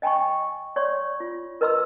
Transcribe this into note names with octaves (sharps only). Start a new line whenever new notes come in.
D#5 G5 G#5 B5 C#6
C#5 D5 C6 C#6
F4
A#4 B4 D#5 B5 C6 E6